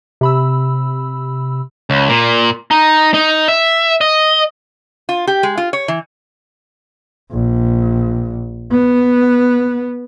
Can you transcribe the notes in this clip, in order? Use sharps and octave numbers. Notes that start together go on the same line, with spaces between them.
C3 B5 E6
C#2
A#2
D#4
D#4
E5
D#5
F4
G4
G#3
F4
C#5
E3
A#1
B3